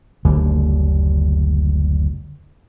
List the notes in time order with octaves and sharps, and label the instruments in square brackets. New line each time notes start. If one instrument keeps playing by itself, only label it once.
[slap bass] F#1 D2 D3 G3